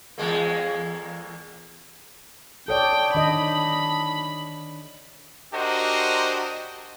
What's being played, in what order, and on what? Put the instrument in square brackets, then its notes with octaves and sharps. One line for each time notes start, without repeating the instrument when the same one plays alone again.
[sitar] E2 G#3 A#3
[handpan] A4 C#5 D5 [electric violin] G5 [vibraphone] A5 D#6
[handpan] D#3 D4 D#5 [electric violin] B5
[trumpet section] D4 F#4 G4 A#4 C5 D#5